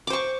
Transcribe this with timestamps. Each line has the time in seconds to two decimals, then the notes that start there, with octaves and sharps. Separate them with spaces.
0.07 D6
0.10 C5
0.13 C#6